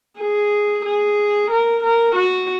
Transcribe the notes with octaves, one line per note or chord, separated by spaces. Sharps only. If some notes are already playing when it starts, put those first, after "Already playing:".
G#4
G#4
A#4
A#4
F#4